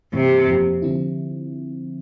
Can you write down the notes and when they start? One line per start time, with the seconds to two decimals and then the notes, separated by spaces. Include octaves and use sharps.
0.13 G2 C3 E3 A#3
0.47 F2 C3 F3 A#3
0.82 D3 F3 C4 E4